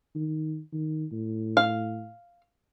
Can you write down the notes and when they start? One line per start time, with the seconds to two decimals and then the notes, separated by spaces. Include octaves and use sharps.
0.15 D#3
0.73 D#3
1.12 A2
1.57 F5